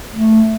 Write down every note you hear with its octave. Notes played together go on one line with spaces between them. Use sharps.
A3